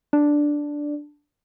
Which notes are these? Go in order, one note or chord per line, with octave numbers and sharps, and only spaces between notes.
D4